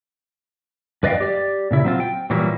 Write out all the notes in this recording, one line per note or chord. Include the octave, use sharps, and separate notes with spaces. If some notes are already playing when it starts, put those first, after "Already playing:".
F#2 B4 D5 D#5 F5 G5
G4 D5
A#2 C#3 E4
F#3 C4 F4
G5
A#2 E3 F#3 G3 A#3